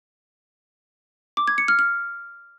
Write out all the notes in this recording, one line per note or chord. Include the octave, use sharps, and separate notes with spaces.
D6
G#6
C#7
F6
F6